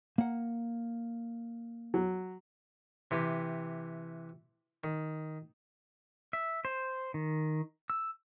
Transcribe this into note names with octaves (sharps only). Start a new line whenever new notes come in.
A#3 F#5
F#3
C3 E3 G4
D#3
E5
C5
D#3
E6